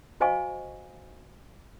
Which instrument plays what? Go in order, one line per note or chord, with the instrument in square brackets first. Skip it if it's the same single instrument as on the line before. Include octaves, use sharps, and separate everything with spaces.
[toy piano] F#4 C5 D#5 F5 G#5 C#6